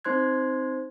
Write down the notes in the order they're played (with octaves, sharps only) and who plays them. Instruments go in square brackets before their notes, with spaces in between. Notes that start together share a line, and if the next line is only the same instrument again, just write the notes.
[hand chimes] C4 D#4 C5 C6 F#6 G#6